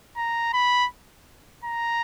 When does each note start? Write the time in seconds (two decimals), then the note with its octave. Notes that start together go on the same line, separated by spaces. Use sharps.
0.17 A#5
0.53 B5
1.64 A#5